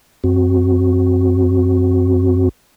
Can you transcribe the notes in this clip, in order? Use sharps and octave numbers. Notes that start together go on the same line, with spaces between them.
F#2 C4 F#4